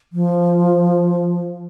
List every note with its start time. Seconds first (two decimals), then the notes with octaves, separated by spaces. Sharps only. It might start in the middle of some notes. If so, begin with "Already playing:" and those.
0.13 F3